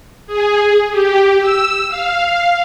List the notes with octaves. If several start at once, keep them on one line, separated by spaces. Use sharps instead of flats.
G#4
G4
E6
F5